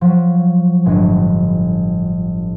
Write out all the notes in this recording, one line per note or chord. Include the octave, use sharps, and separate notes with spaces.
F3 F#3
G1 A2 G#3